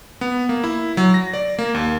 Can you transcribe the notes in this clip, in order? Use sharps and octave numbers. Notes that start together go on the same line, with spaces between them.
B3
A#3
E4
F#3
A#6
D5
A#3
D#2